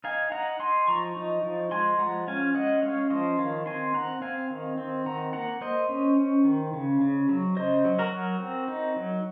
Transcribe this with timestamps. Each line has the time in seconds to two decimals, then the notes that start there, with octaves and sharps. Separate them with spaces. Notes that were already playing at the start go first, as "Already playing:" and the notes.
0.04 D#4 F5 G#5
0.32 D#4 F#5 A#5
0.59 D#4 G#5 C6
0.87 F3 A#5 C#6
1.16 D#4
1.43 F3
1.71 G#3 G#5 C6
1.99 F3 F#5 A#5
2.28 C#4 F5 G#5
2.54 G#3 D#5 F#5
2.82 C#4 C#5 F5
3.10 F3 C5 D#5
3.39 D#3 C#5 F5
3.66 C4 G#5 C6
3.94 C4 F#5 A#5
4.22 C4 F5 G#5
4.50 D#3
4.78 C4
5.06 D#3 F#5 A#5
5.33 A#3 F#5 A#5
5.61 A#3 C5 D#5
5.89 C#4
6.17 C#4
6.45 D#3
6.73 C#3
7.01 C#3
7.29 F#3
7.57 C#3 C5 D#5
7.85 F#3
7.99 F#4 A#4
8.12 F#3
8.40 C4
8.68 D#4
8.96 F#3